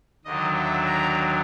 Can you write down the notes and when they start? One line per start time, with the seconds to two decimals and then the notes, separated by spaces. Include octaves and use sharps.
0.25 D#2 D3 F#3 D#5
0.55 E5
0.86 A#5